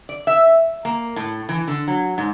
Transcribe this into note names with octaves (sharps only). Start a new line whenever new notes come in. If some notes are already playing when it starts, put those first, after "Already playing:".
D5
E5
A#3
A2
E3
D3
F#3
G#2